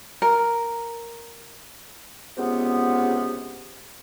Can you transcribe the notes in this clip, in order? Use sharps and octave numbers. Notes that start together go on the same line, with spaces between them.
A#4
C#2 C3 B3